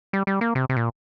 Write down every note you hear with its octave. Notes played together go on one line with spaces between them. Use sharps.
G3
G3
A#3
C3
C3
A#2